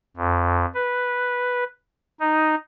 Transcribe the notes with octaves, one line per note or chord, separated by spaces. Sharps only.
F2
B4
D#4